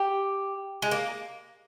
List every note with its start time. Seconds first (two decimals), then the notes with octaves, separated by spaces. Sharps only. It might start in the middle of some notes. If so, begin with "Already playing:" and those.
Already playing: G4
0.82 G#3
0.91 A#3